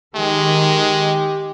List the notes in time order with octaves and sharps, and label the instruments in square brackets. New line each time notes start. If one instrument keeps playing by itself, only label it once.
[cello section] D#3 [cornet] G#3 [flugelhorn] G4